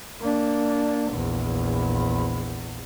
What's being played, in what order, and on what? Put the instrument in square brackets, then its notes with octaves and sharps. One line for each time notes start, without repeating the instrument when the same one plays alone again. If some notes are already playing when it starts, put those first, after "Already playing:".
[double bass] A#3 D4
A#1 E2